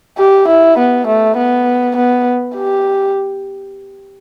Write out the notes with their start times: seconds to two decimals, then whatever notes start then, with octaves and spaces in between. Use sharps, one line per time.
0.18 G4
0.48 E4
0.78 B3
1.07 A3
1.37 B3
1.96 B3
2.56 G4